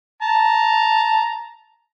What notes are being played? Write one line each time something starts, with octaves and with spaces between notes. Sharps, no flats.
A5 A#5